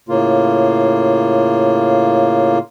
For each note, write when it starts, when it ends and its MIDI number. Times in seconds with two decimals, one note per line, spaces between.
0.09 2.58 45
0.09 2.58 49
0.09 2.58 58
0.09 2.58 65